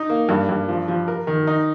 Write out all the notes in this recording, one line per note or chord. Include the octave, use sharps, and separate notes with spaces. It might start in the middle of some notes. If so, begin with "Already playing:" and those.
Already playing: D#4
A#3
G2
G2
F3
F3
A#4
D#3
D#4